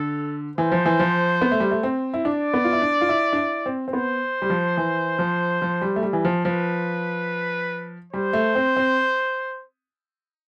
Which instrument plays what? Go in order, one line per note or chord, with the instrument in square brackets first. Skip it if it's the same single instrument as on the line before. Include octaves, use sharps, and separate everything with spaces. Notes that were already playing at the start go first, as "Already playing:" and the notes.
Already playing: [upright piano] D3 [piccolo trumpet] A4
[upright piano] E3 [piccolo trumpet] C5
[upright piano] F3
E3
F3
B3
A3
G3
A3
C4
E4
[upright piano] D4 [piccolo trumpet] D5
[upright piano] B3
F4
E4
D4
F4
E4
D4
E4
C4
C4
[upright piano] B3 [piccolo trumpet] C5
[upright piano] G3
F3
E3
F3
F3
G3
A3
G3
E3
F3
[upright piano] F3 [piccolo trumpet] B4
[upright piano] G3 [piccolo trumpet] C5
[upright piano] A3
C4
C4